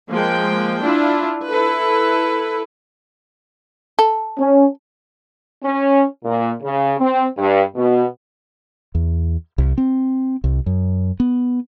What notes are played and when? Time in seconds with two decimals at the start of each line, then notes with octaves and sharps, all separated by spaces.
0.11 F3 G#3 A#3 G5
0.82 D4 E4 F4
1.49 E4 A4 B4
3.99 A4
4.38 C#4
5.63 C#4
6.24 A#2
6.63 C#3
6.99 C4
7.37 G2
7.76 B2
8.95 E2
9.58 C2
9.78 C4
10.44 C2
10.66 F#2
11.20 B3